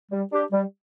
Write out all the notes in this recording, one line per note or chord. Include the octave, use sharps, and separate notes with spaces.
G3
D4 G4
G3